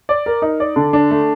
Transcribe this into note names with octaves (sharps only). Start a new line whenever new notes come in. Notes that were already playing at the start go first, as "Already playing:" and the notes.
D5
A#4
D#4
D5
D3
D4
A3